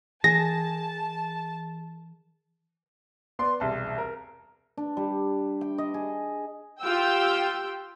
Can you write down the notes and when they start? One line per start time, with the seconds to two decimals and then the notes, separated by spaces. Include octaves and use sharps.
0.24 E3 G#4 A5 A#6
3.39 B3 D5 C6
3.60 E1 C2 A5
3.98 A#4
4.77 D4
4.97 G3
5.61 G5
5.78 D#5
5.94 G#4
6.81 F4 G4 G5 E6